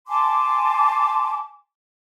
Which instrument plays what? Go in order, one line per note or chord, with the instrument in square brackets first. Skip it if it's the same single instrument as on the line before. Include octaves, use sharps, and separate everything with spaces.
[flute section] G#5 A5 C6 D6